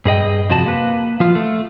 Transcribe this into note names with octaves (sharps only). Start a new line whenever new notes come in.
G2 G#4 D#5 G5
F2 C3 F#4 A5
A#3 B4
F3 F4
A3